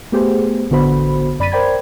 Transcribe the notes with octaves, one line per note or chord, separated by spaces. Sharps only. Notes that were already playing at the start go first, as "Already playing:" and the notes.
A3 B3 G4 G#4 C5
A1 D3 B3 F#4 C5 B5
F#2 D5 B5 A6 B6 D#7
A#4 C5 D5 G5 B5 G#6